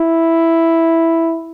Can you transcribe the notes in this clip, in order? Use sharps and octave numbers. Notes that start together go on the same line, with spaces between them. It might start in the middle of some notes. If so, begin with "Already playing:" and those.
Already playing: E4